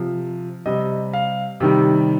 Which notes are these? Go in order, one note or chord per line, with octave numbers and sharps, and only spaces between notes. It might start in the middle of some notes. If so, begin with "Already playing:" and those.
Already playing: C3 F3
C3 G3 D#5
F5
C3 D#3 G3